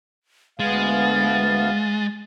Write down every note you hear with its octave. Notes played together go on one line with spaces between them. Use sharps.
D2 G#3 B3 F5 A6